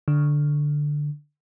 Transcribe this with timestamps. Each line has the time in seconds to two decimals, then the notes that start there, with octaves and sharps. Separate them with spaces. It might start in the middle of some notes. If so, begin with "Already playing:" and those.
0.08 D3